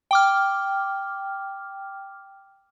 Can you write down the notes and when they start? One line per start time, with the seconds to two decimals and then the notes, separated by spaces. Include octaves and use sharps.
0.11 G5 D6 F6